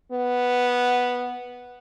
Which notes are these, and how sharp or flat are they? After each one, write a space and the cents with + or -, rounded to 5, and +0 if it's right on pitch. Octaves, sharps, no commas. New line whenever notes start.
B3 -5